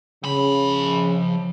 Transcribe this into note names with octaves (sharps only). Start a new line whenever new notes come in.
C#3 F3 B5